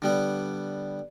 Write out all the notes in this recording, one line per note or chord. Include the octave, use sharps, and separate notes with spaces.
D3 G3 B3